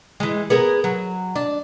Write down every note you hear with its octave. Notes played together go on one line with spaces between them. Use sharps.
E3 G#3
B3 G#4 A#4
F#3
D4